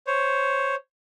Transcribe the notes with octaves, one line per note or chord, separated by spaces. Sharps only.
C5 C#5